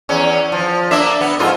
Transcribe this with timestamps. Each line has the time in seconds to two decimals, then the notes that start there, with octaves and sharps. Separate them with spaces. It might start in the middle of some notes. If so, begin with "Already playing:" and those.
0.09 E2 C#4
0.52 F3
0.91 A#3 D4 E5
1.21 B3
1.39 F2 G#2 F4